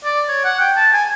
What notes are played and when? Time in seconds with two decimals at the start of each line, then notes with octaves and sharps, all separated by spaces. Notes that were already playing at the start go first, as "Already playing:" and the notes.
0.04 D5
0.29 C#5
0.45 F#5
0.60 G5
0.77 A5
0.93 G#5